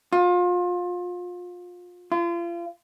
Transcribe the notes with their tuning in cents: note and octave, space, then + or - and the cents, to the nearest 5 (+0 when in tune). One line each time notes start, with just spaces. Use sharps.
F4 +30
F4 -35